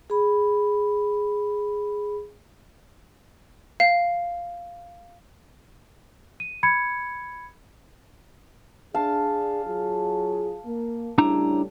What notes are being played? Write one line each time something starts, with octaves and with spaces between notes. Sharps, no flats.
G#4 B5
F5
D#7
B5 G#6 C#7
D4 G#4 F5 A5
F#3 F4 G#4
A#3
A2 C#3 G3 D4 E4 A#5